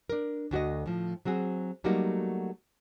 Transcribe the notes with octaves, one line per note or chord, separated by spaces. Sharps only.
D4 A#4
D2 F#4 D#5
A2 F3
F#3 C4 F#4 G#4
F#3 G3 A3 A#3 D#4 F#4